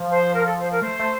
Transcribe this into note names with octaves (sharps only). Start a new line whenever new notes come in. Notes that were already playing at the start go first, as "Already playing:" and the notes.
Already playing: F3
C5
A#4
A4
C5
A#4
A3 C5
A3